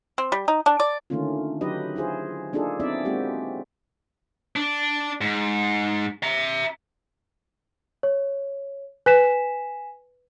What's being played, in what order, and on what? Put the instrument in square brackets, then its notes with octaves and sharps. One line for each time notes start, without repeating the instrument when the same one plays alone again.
[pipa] C4
G3
D#4
D4
D5
[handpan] D3 D#3 A3 A#3 C#4 F4
F#3 D#4 G4 B4 D#5
E4 F4 G#4 C5
A#3 D4 D#4 F4 G#4 A4
B3 C4 D#4 E4 D5 E5
G#3 A#3 C4 F#4 G4
[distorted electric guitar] D4
G#2
E5 A#5
[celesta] C#5
[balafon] B4 [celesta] G#5 B6 E7